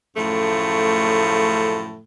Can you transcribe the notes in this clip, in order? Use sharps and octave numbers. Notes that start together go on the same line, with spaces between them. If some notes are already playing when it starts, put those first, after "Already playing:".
F#2 A2 C#3 F3 A3